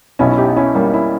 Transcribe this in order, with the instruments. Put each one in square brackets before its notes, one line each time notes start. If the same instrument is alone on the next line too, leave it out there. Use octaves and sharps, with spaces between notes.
[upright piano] B1 B2 C#4 E4
E4
D#4 G4
C#4 E4
G3 A#3
C#4 E4